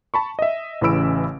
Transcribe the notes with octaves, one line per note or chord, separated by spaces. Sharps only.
A5 B5 C#6
D#5 E5
A1 C#3 E3 B5 E6 D7